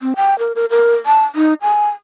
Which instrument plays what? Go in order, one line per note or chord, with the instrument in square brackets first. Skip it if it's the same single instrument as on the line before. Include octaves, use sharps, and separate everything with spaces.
[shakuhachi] C4
G5
A#4
A#4
A#4
A5
D#4
G#5